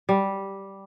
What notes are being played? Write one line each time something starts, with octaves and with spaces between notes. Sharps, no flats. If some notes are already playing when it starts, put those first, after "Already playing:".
G3